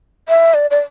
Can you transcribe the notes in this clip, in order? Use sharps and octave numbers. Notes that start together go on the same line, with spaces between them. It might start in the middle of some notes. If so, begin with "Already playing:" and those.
E5
D5
D5